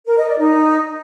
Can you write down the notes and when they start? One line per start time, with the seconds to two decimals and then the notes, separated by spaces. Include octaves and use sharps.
0.06 A#4
0.17 D#5
0.27 D5
0.38 D#4